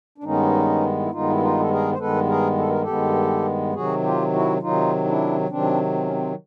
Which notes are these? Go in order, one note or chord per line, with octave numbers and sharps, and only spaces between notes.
D4
G2 D#3 G#3 B3 C#4 D#4
E4
G2 D#3 G#3 B3 D#4 F4
E4
D#4 F4
A4
G#4 A#4
C5
G2 D#3 G#3 B3 A4 B4
G#4 A#4
A4
A#4
G4 A4
G2 D#3 G#3 B3
C3 D#3 F#3 F#4 G#4
F4 G4
E4 F#4
C3 D#3 F#3 D#4 F4
D4 E4
C3 D#3 F#3 C4 D4
C4
C#4
C4